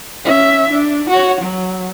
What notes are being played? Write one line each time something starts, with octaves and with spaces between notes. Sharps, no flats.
C#4 E5
D4
F#4 C#5
F#3